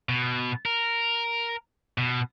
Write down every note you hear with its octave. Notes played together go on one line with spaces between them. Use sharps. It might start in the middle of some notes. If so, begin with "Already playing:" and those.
B2
A#4
B2